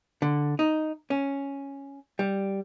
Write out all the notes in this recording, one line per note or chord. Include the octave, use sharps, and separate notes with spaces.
D3
D#4
C#4
G3